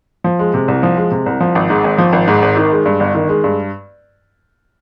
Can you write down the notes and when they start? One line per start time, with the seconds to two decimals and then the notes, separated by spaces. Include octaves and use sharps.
0.24 F3
0.39 G#3
0.54 C3
0.68 C2
0.83 F3
0.97 G#3
1.11 C3
1.26 C2
1.41 F3
1.55 G#1
1.70 G#2
1.84 G#1
1.98 F3
2.13 G#1
2.28 G#2
2.42 G#1
2.57 D#3
2.72 G#3
2.86 G2
3.00 G1
3.15 D#3
3.29 G#3
3.44 G2